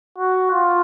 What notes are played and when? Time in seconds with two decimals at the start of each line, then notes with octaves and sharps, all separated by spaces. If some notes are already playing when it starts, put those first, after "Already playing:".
0.18 F#4
0.51 F4